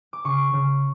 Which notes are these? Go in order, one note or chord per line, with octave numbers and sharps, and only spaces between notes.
D6
C#3 C#6
C#3